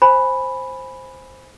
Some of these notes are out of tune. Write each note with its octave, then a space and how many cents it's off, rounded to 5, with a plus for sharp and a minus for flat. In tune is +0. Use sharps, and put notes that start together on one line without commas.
C5 +5 G#5 +0 B5 +0